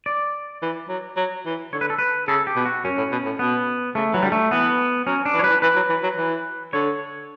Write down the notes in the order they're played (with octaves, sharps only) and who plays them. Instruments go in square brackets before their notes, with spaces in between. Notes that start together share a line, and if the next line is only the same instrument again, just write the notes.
[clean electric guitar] D5
[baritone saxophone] E3
F#3
F#3
E3
[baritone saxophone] D3 [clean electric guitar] C#5
[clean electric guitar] B4
A4
B4
[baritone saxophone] C#3 [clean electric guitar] A4
[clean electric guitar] G4
[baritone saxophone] B2
[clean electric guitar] F#4
[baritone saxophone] F#2 [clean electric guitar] C#4
[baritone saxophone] A2
B2
A2
[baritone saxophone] B2 [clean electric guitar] B3
[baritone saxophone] C#3 [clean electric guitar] A3
[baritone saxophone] E3 [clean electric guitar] F#3
[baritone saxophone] D3 [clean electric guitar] G3
[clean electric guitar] A3
[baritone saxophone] E3 [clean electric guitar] B3
[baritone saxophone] F#3 [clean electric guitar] C#4
[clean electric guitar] D4
[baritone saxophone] E3
[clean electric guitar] C#5
[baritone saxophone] F#3 [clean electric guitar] B4
[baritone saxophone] E3
[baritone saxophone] E3 [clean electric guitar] B4
[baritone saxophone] F#3
E3
F#3
E3
[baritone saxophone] D3 [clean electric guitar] C#5